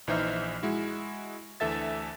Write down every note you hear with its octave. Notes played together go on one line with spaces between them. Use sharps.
A#1 E3 D#4 C5 E5 F6
G#3 E4 F#4
D2 E3 A4 E5 A6